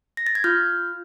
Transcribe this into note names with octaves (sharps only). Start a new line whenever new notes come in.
A#6
A6
G#6
F4 F6 G6